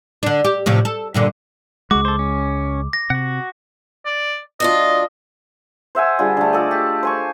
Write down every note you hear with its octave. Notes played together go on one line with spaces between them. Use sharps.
D3 D4
G4
A2 C3 F3
A4
G2 A#2 D3
C#2 G#3 F#4 D6
A4 C5
C#4
A#6
C3 F#4 F#5
D5
D2 D4 F4 D#5
C5 E5 F#5 G#5
D3 G3 F4 G#4
D3 A3
F4 A4 D5 D#5
G4
C5 G#5 C#6